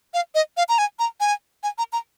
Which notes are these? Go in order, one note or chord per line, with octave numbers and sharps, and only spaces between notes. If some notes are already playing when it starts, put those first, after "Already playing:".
F5
D#5
F5
A#5
G#5
A#5
G#5
G#5
A#5
A#5